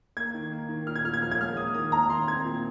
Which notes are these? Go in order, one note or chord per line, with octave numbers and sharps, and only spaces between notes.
A#3 G#6
D#3
A#3
D#3
A#2 F6
G#6
A#2 F6
G#6
F3 F6
G#6
G#3 F6
A#3 D#6
D#3 D#6
A#3 A#5
D#3 C6
C4 G#6
A#2